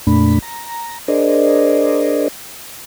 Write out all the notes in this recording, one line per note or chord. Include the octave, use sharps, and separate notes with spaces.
F2 A#2 A3 D4 B5
A#5
D4 G#4 A#4 C5 D5 D#5